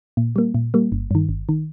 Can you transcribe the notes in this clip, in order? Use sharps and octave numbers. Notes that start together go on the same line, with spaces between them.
A#2
G3 A#3
A#2
G3 A#3
G1
G2 D#3
G1
D#3